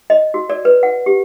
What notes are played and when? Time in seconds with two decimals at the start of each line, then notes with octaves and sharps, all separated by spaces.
0.10 D#5
0.34 F#4
0.50 D5
0.65 B4
0.83 F#5
1.06 G4